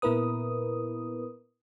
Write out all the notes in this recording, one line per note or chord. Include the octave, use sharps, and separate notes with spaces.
A#2 B3 E4 A#4 B4 D#6